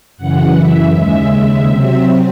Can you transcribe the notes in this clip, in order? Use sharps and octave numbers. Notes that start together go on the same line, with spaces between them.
F#2 C#3 E3 F#5
E5
D#2 C#3 G#3 E5
C3 F#3 C4